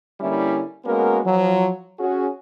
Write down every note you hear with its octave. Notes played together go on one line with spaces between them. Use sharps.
D3 G3 A#3 C#4 E4
G#3 A#3 B3 C#4 F#4 A#4
F3 F#3
C#4 F#4 G#4